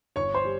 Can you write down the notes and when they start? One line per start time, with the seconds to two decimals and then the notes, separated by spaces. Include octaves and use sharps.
0.16 G1 C#5 C#6
0.34 C5 C6
0.44 G3